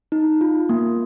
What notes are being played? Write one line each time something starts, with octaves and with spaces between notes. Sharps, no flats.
D#4
F4
A#3